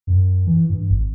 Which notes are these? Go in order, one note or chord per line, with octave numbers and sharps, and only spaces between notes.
F#2
E3
G2
G#1